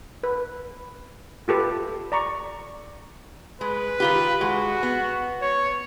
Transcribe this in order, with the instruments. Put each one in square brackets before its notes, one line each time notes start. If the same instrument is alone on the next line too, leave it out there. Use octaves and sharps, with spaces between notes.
[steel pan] B4
F4 G4 A4 B4
D5 A#5 C#6
[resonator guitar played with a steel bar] G#3 [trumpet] B4
[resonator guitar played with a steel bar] D#3 F4 G4
[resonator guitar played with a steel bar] G#3 [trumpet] F#4
[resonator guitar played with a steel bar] B3
[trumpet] C#5